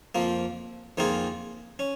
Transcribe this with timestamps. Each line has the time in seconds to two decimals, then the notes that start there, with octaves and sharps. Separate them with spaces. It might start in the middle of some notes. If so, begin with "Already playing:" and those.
0.15 F2 F3 A#3
0.97 F2 D#3 A#3 F4 G#4
1.79 C#4